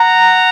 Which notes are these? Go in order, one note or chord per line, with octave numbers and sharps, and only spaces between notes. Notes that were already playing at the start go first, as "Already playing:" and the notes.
Already playing: F#5 A#5